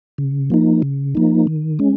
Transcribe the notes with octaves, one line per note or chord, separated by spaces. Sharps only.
C#3
F3 A#3 D#4
C#3
F3 A#3 D#4
D#3
G#3 C#4